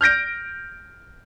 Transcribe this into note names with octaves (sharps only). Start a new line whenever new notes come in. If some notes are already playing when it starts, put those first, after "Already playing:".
F6 G6 A#6 D7